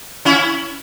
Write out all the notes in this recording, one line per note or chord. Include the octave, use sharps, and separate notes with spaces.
C#4 E4